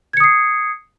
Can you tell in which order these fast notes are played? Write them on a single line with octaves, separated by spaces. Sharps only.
G#6 C#7 D#6 C7